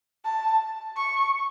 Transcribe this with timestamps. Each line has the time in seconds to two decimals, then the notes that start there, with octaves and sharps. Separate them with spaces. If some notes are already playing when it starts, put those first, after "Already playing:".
0.25 A5
0.97 C#6